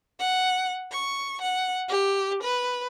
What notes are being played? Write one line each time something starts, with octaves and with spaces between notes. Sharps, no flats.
F#5
C#6
F#5
G4
B4